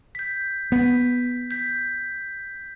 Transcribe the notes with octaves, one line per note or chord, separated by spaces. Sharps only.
G6 B6
B3 B6
G6 B6